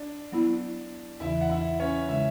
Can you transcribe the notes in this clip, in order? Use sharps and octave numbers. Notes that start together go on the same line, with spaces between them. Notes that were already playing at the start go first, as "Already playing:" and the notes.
Already playing: D4
F#3 B3 E4
E2 C#3 E3 E4 E5
F#5
E4 E5
C#4 C#5
C#3 G#3 E4 E5